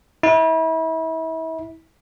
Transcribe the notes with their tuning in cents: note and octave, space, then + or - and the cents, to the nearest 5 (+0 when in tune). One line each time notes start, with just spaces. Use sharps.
E4 -35